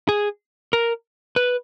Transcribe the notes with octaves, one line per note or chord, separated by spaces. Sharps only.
G#4
A#4
B4